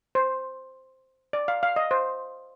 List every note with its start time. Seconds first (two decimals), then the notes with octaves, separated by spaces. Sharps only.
0.15 C5
1.33 D5
1.48 F5
1.63 F5
1.76 D#5
1.91 C5